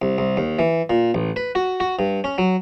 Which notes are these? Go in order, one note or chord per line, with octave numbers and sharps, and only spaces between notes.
C2
C2
D#2
E3
A#2
A1
B4
F#4
F#4
G2
C#4
F#3